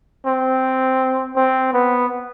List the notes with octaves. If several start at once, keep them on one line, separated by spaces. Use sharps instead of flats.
C4
C4
B3